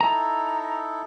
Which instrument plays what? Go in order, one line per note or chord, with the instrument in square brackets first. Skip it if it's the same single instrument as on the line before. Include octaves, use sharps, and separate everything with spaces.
[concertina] D#4 E4 A4 [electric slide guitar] A#5